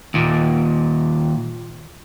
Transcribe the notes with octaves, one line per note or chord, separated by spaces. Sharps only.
D#2 A#2